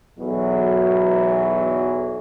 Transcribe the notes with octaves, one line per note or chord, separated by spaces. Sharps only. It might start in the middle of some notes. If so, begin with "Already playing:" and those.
B1 E2 B2 E3 F#3